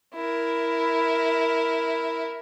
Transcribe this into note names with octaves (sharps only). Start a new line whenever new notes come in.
E4 A#4